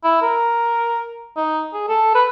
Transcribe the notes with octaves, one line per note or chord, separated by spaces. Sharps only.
E4
A#4
D#4
G#4
A4
B4